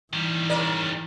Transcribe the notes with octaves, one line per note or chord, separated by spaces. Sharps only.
D#3 E3 G3
C#3 A#4 D5